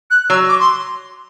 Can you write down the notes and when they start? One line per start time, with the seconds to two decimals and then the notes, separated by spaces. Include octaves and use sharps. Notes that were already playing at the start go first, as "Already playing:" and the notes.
0.11 F#6
0.30 F#3 E6
0.49 D6
0.60 C6